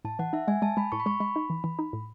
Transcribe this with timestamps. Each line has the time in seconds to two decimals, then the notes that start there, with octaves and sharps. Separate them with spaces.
0.05 A2 A5
0.19 E3 F#5
0.33 D#4 E5
0.48 G#3 G#5
0.62 G#3 A5
0.77 G#3 B5
0.92 A2 C#6
1.00 B5
1.06 G#3 C#6
1.20 G#3 B5
1.36 D#4
1.50 E3
1.64 E3
1.79 D#4
1.93 A2